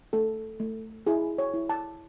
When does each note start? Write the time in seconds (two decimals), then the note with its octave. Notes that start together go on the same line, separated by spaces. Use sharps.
0.13 A3 A4
0.60 A3
1.07 E4 G#4
1.38 C#5
1.54 E4
1.69 A5